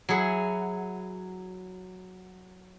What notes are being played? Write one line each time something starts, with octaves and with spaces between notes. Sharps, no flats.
F#3 E4 G#4 F#5